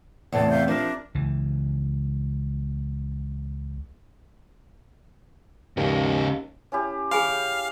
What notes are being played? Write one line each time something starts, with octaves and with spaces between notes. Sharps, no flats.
E2 A2 C3 A5
E5 F5 G6
F3 D4 A#4 E5
C#2 E3
D#2 G#2 C#3
C#4 E4 G4
G#4 F5 G#5 B5